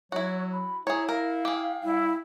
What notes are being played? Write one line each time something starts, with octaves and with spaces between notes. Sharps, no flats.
F#3 E4 F#4 C#5
B5
E4 G#4 C#5 A#5
A#4 F5
G4 G#4
G3 E4